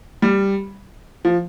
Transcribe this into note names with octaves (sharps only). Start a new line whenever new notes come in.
G3
F3